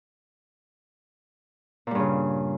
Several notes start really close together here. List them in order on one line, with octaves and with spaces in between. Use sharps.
A#2 G3 G2 C#3